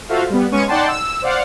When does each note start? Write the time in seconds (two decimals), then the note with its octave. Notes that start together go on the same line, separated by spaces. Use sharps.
0.09 F4 F#4 A4 C5 E5 F5
0.30 G3 B3
0.51 G#3 B3 C#4 C#6 D#7
0.68 D#4 D5 F#5 G5 A5 C6
0.88 E6
1.22 C5 D5 F5 F#5